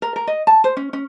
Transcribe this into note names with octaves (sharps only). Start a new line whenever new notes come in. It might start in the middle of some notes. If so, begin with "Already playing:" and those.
A#4
A#4
D#5
A5
C5
C#4
C#4